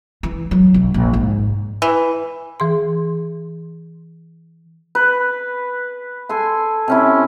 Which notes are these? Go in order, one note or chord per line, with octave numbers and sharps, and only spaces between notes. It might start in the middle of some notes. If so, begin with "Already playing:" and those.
E3
F#3
B1
A#1
G#2
E3
E3 G#4 C6
B4
A4 G#5 C6
C3 C#4 E4